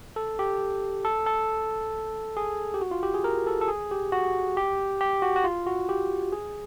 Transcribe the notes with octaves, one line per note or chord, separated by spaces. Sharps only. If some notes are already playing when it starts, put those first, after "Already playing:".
A4
G4
A4
A4
G#4
G4
F#4
F4
G4
G#4
A#4
A4
A4
G#4
G4
F#4
G4
G4
F#4
F#4
F4
F#4
G4
G#4